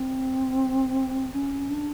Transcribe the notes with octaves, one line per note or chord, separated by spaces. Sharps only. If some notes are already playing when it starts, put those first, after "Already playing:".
Already playing: C4
C#4
D4